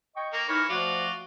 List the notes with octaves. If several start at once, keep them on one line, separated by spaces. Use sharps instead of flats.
D#5 G5 C#6
A#3
E3 D#4 A#4 C#5
F3 A3 F4 F#4 D5